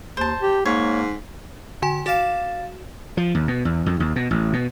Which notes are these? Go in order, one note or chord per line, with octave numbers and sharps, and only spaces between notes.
D#2 C5 A5
G4
G#2 A#3 C#5
D3 F#4 G#5
F#4 D5 F5 E7
F3
D#2
B2
E2
F2
D#2
B2
A1
B2